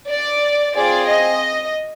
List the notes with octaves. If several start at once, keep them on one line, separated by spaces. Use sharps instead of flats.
D5
C4 F4 G#4 D5
D#5